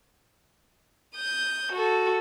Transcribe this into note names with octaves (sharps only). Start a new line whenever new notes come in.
D#6 G6
F#4 A4